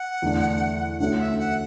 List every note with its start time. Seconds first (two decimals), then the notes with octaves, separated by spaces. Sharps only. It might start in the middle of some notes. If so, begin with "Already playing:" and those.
Already playing: F#5
0.22 E2 D3 A3 D4
0.99 D2 D3 A3 C#4 F#4 F#5
1.20 E5
1.39 F#5